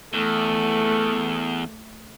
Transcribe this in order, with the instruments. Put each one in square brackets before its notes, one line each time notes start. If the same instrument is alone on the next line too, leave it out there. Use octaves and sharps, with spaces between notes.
[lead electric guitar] E2 [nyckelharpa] A3